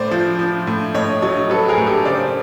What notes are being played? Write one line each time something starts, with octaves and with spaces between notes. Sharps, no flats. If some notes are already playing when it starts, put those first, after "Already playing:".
Already playing: A2 C5 D5
F3
F3
A2
A2 C#5 D#5
F#3 C#5 D#5
F#3 A4 B4
G#4 A#4
A2
G4 A4
C#3 C5 D5